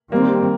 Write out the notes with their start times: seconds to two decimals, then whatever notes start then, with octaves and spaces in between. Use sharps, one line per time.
0.12 D#3 G3 A#3 C4